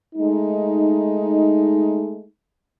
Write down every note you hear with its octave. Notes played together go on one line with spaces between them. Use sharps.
G#3 A3 D#4